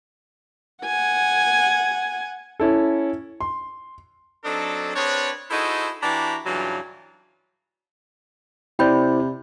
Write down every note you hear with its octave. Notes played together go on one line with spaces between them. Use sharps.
F#5 G#5
C#4 E4 A4
C6
F#3 C4 D4 D#4 A4
C4 D4 G#4 B4 C#5
D#4 E4 F#4 G#4 A4 C5
E3 D4 F#4 G4 A#5 B5
G2 C#3 E3 F#3 D4 F4
C3 E4 C5 D5 G5 B5 G6